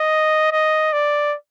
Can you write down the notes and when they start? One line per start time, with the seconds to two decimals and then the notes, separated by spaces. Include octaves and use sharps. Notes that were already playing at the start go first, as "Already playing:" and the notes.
Already playing: D#5
0.52 D#5
0.93 D5